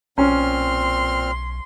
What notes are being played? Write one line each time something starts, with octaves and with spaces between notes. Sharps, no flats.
B1 A#2 C4 C#4 C6 F6